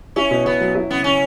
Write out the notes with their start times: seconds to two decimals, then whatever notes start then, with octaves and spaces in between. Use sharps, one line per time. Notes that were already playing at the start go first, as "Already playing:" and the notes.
0.16 C#4 E4
0.31 B2
0.46 B2 B3
0.61 F#3
0.75 E4
0.90 C#3 B3
1.04 C#3 C#4